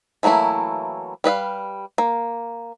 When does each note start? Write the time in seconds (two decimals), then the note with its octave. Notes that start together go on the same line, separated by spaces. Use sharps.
0.23 E3 F#3 A3 A#3 E4
1.24 G3 B4 D#5 F5
1.98 A#3